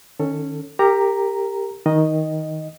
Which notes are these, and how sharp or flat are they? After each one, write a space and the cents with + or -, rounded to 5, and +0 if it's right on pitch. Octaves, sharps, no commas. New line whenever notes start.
D#3 -20 C#4 +0 A4 +15
G4 +10 A#4 -25 A#5 +0
D#3 +15 D#5 +0